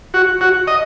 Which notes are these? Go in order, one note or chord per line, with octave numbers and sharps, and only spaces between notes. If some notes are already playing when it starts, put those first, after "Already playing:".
F#4
F#4
D#5